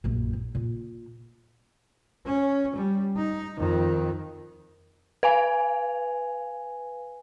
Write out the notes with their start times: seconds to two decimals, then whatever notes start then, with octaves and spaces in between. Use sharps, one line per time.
0.04 A#1 F#2
0.33 D#4
0.55 A#2
2.25 C#4
2.76 G3
3.16 D#4
3.59 F2 D#3
5.23 B4 F5 G#5